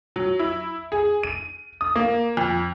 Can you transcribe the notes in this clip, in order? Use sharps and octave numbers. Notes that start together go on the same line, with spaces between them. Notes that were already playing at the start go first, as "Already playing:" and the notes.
F#3
E4
G#4
D#7
D#6
A#3
F2